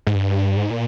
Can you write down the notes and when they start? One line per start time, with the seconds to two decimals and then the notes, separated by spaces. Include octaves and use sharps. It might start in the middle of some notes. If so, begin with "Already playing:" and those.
0.07 G#2
0.15 G2
0.57 G#2
0.70 A#2